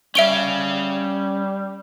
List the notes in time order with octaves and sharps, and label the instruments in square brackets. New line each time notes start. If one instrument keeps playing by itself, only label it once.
[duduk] G3 [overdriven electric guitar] C#4 F5 [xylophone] E5 D7 G7